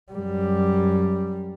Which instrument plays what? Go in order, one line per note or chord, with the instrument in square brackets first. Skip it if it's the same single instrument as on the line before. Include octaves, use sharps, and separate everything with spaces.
[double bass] F#2 G3